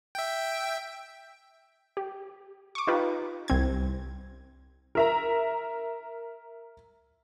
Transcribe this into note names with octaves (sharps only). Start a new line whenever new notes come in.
E5 G5
G4
C#6 D6
D#4 F4 G4 B4
C2 C4 G#6
A#4 E5 A#5